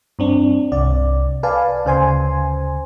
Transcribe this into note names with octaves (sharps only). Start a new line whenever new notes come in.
G2 C4 D4
C2 D5
B4 D5 F5 G#5 A5
D2 C#3 C5 G#5 C6